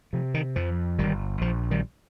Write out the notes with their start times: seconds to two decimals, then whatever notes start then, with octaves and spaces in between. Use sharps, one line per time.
0.13 C3 F3
0.34 D#3
0.56 F2 F3
0.99 G1 D#3 G3
1.41 A#1 F3
1.71 D#3 G3